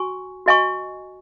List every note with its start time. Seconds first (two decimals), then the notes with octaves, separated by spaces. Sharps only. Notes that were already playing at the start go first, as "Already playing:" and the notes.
Already playing: F#4 G#5 C#6
0.46 F#4 D#5 G#5 C#6